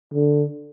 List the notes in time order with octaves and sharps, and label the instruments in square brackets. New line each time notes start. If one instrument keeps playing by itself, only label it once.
[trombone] D3